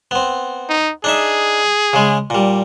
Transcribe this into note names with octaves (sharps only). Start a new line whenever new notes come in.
B3 C4
D#4
D4 D#4 G#4 E5
C#3 G#3
A#2 G3